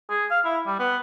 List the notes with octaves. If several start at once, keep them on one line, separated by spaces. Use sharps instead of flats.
G#4
F5
E4
G3
B3